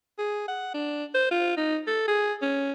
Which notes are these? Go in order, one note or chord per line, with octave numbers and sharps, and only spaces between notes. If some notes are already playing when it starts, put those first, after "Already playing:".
G#4
F#5
D4
C5
F4
D#4
A4
G#4
C#4